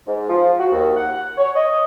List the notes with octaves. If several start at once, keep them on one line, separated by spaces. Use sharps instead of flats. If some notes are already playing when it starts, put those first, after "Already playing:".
G#2
F3
F#4
D#2
F#5
C#5
D#5